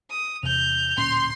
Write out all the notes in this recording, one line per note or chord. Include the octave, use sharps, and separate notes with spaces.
D#6
E2 C3 G6 F7
D1 A#2 C#4 C6